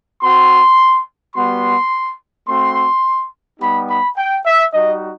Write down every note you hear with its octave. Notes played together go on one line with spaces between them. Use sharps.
C4 F#4 C6
G3 B3 F#4 C6
A3 C4 F#4 C6
G3 B3 D#4 G4 B5
B5
G5
E5
G3 D#4 F#4 D#5